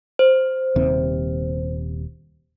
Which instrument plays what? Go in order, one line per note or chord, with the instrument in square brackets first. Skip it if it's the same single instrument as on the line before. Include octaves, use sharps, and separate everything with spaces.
[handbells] C5
[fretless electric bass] D#1 D#2 C3